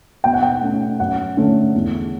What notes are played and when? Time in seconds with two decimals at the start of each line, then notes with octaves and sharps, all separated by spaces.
0.24 B2 G5
0.34 F#5
0.43 G5
0.61 A3 C#4
1.00 F#2 F#5
1.37 D3 A3 C#4
1.75 E2